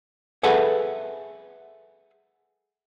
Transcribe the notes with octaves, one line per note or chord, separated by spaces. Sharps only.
G#4 A4 B4 E5 F#5 G#5